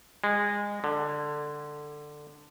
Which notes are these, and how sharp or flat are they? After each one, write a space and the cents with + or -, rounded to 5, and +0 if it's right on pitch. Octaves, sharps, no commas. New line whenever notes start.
G#3 -20
D3 +15